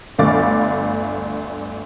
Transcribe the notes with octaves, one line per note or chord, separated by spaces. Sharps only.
G1 D2 D3 F5 D6 A6